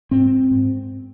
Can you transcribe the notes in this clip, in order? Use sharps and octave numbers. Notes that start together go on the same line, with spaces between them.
G#2 C4
G#2